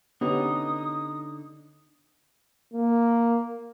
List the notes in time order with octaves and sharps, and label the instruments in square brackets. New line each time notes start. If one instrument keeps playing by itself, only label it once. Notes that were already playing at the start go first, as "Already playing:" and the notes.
[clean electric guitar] D3 D#4 [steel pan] B3 C#4 G4 [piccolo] D#6
[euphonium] A#3